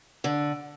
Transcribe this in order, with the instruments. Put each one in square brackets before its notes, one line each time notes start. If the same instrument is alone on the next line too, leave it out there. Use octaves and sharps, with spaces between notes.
[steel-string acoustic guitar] D3